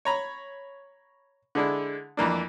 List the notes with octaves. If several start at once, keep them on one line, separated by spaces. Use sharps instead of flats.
C#5 A#5 B5
D3 G#3 D4 E4
F2 E3 A#3 D4